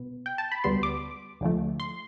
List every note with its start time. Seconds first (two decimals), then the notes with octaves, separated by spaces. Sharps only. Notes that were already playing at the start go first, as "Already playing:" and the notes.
Already playing: B2 B3
0.26 G5
0.38 A5
0.52 B5
0.64 D2 D3 G3 B3 C6
0.83 D6
1.41 D2 D3 F3 A3
1.80 C6